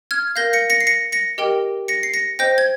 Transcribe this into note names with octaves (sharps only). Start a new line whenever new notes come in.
F6 G#6
A#4 F5 G6 A#6
A#6 C#7
A#6 C#7
C7
A#6 C#7
A#6 C#7
G4 A#4 D#5 G5
A#6 C#7
C7
A#6 C#7
C5 D#5 G5 G6 A#6
G#6